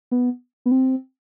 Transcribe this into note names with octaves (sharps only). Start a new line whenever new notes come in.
B3
B3
C4